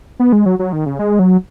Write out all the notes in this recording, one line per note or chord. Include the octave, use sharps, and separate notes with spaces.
B3
G#3
F#3
F#3
D#3
C#3
G#3
F#3